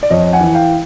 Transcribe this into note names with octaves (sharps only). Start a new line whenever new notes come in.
D5
F2 C#5 D#5
F#5 G#5
E3
F5 G5